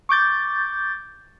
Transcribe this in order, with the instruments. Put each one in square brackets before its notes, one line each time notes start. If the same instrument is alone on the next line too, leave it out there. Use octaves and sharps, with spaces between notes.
[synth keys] C#6 D6 G6 A6